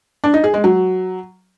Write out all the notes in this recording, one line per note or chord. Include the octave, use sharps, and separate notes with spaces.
D4
D#4
G#4
G#3
F#3